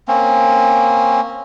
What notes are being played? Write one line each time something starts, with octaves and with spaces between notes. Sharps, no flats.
A#3 C4 C#4